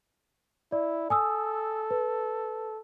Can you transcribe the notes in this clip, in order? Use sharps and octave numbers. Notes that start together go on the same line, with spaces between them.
E4 D5
A4 G#5 D#6 E6
B4